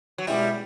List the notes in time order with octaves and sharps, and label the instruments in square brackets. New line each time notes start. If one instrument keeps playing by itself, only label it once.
[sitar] F#3
[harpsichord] B2 G#3 C#4 E4 [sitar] G3